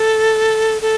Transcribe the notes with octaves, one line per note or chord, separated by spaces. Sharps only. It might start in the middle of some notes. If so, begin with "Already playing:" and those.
Already playing: A4
A4